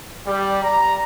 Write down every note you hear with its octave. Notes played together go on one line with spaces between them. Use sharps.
G3
A#5